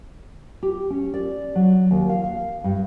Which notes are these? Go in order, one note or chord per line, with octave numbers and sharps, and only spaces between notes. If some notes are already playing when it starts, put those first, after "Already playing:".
G4
C#4
D5
F#3
D#2
F5
F5
G2